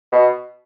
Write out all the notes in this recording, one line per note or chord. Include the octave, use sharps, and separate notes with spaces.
B2